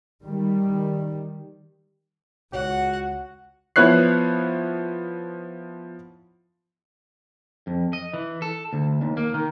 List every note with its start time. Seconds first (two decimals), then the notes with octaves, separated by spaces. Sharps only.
0.23 D#3 G3
2.53 C#2 F#4 C#5 F#5
3.76 F3 B3 E4 C#5 F#6 C7
7.67 F2
7.93 D#5
8.14 E3
8.42 A4
8.73 D2
9.01 D#2
9.17 A#3
9.34 D#3